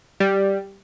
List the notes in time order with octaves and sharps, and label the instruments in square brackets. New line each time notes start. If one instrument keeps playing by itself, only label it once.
[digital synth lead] G3